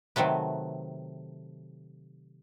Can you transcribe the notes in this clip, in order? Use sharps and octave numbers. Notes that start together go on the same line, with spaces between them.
C3 D#3 F#3 A3 B4